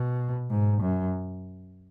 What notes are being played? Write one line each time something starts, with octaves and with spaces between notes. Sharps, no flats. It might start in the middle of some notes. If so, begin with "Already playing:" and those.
Already playing: B2
G#2
F#2